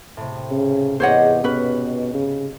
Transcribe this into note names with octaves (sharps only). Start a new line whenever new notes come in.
A2 C3
C#3
E2 G#2 G4 C5 C#5 D#5 F#5
B2 C#4 B4
C#3